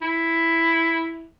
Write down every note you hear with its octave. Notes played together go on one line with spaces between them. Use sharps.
E4